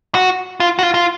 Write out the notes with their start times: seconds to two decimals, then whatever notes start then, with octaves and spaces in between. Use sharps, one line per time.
0.15 F#4
0.60 F4
0.79 F#4
0.83 F4
0.94 F4